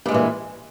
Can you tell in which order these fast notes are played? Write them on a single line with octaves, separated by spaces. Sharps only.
G2 G#3 A#2 E3